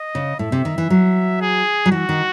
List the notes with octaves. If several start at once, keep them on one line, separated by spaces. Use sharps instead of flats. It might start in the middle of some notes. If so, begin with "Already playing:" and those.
Already playing: D#5
C#3
A2 E5
C3
D#3
E3
F#3
G#4
F#3
E3 F#4
D#3